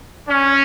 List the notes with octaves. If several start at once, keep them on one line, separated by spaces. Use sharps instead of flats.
C#4